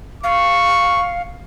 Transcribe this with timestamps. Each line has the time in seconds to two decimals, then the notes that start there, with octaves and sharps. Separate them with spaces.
0.23 F5 C#6